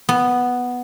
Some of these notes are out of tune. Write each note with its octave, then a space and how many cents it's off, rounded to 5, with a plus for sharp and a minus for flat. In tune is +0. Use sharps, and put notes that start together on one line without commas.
B3 +0